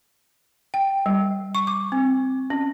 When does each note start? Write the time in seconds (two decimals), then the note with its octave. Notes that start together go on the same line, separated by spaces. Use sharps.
0.74 G5
1.06 G3
1.55 C#6
1.67 D6
1.92 C4
2.50 C#4